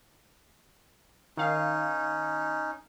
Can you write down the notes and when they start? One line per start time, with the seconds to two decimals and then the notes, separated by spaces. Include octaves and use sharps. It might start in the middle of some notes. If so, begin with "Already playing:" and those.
1.37 D#3 C#4 D#4 F5